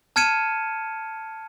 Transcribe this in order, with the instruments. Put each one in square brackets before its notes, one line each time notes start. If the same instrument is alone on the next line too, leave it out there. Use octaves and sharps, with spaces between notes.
[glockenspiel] A5 F6 G#6 C#7 D#7 E7